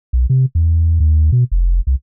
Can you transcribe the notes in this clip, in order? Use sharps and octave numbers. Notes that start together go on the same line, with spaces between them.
B1
C3
E2
D#2
B2
F1
C2